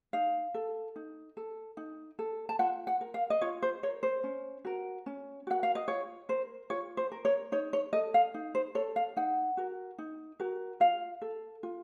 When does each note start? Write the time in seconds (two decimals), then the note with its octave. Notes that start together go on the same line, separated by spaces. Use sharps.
0.13 D#4 F5
0.54 A4
0.96 D#4
1.37 A4
1.77 D#4
2.19 A4
2.49 A5
2.59 F4 F#5
2.87 F#5
3.01 A#4
3.14 F5
3.30 D#5
3.41 F4 C#5
3.62 C5
3.83 A#4 C#5
4.03 C5
4.24 C#4
4.65 F#4 A#4
5.06 C#4
5.47 F#4 A#4 F#5
5.63 F5
5.75 D#5
5.88 F4 C#5
6.29 A#4 C5
6.70 F4 C#5
6.97 C5
7.12 A#4
7.25 C#5
7.52 D#4 C#5
7.73 C#5
7.93 A4 D#5
8.14 F5
8.34 D#4
8.55 C5
8.75 A4 C#5
8.96 F5
9.17 D#4 F#5
9.57 F#4 A#4
9.98 D#4
10.40 F#4 A#4
10.80 F4 F5
11.22 A4
11.63 F4